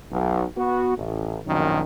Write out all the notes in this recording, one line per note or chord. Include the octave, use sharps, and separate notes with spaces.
B1
B3 F#4
A1
A#1 F#2 B2 D#3